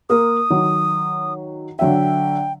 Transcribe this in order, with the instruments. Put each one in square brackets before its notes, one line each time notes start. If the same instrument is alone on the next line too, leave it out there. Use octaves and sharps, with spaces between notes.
[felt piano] A#3 A#4 [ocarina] D#6
[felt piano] D#3 F#3
[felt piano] D3 F#3 E5 [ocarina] G5